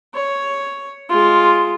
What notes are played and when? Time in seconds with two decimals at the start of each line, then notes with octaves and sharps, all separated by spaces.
0.14 C#5
1.10 G#3 F4